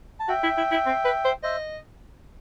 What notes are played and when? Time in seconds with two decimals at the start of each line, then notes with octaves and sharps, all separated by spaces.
0.20 A5
0.29 F#4 E5 G5
0.44 E4
0.58 E4
0.72 E4
0.86 C4
1.05 B4
1.25 C5
1.43 C5 D#5 E5